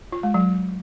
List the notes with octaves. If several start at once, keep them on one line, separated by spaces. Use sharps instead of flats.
F4
G#3
F#3